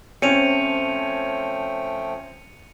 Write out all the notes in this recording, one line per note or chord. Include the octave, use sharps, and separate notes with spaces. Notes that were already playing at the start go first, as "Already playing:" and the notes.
F3 A3 C4 C#4 G5 C#7 D#7 F7